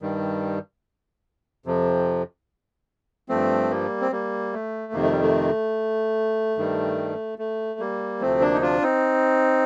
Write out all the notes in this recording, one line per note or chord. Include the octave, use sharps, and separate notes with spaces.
G2 D#3 G3
F2 C3 F3
G2 F3 A3 C4
G3 A#3
C4
G3 A#3
A3
F2 C3 D#3 A#3
A3
G3
A3
G2 D#3 G3
A3
G3 A#3
D2 C3 F3 A3 C4
A#3 D4
D#4
D4 F4
C4 D#4